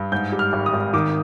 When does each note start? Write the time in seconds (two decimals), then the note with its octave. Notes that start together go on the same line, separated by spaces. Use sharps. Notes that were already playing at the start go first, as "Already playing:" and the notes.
Already playing: G2
0.12 G#2 G6
0.32 G3
0.39 F6
0.53 G#1
0.66 D#6
0.73 G#1
0.93 D#3 D6